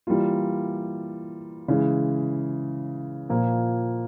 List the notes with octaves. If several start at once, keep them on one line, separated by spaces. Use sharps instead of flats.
E3 G3 A#3 F4
C#3 E3 G#3
A#2 F3 A#3